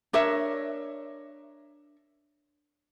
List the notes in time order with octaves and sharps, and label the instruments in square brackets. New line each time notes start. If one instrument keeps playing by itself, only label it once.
[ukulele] D4 A#4 C#5 E5